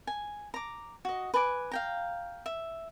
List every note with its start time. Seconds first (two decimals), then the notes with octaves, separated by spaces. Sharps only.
0.07 G#5
0.54 A#5 D6
1.05 F#4 D#5
1.34 B4 G#5 A5 D6
1.72 F5 G5 A#5
2.46 E5